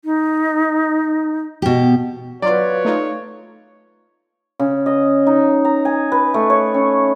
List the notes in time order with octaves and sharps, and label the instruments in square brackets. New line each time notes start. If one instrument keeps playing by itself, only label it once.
[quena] D#4
[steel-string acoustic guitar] B2 G4
[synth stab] F#3 F4 [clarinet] B4 [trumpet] C#5 [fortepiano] D5
[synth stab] A3 D#4 F4
[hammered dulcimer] C#3
D#5
D#4
A#5
G#5
B4
A3
C#5
C#4